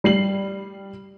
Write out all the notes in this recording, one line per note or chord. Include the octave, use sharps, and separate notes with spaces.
G3 C7 F#7